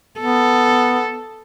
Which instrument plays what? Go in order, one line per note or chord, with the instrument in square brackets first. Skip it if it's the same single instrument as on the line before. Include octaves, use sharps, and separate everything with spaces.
[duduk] B3 [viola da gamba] A4